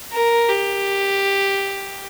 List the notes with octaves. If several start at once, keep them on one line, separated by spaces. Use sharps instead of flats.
A#4
G4